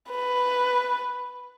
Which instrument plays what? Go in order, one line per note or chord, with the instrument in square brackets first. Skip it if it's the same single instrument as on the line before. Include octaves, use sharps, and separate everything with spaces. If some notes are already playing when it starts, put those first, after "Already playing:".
[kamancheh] B4